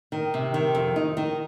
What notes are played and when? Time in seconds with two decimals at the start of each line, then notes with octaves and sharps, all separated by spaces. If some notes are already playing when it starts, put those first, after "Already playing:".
0.12 D#3
0.34 C3
0.54 D#3
0.75 F2
0.96 D#4
1.17 D#3